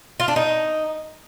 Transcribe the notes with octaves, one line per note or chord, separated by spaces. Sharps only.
F4
D4
D#4